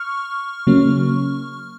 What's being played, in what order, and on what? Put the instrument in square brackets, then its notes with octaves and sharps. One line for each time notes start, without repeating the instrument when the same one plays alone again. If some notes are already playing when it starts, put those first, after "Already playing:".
Already playing: [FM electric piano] C#6 F6
C#3 F#3 A#3 C#4